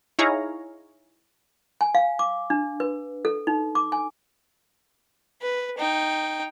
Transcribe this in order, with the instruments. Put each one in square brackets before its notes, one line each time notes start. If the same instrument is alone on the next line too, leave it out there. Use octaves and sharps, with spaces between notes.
[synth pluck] D#4 E4 G#4 C#5 F5 A#5
[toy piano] G#5
F5
D6
D4
B4
A4
D#4
D6
G#5
[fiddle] B4
D#4 G5